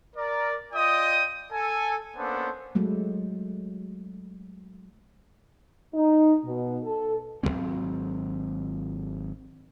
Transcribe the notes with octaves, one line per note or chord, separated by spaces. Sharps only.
A#4 D5
F4 D5 D#5 G5 D#6
A4 G#5
A#3 B3 C#4 D4 A4 C5
F#3 G#3 A3
D#4
B2
A4
G#1 G2 F#3 C4